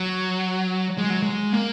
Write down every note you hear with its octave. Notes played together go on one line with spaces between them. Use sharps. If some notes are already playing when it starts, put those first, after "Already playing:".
Already playing: F#3
G#3
F#3
G#3
A#3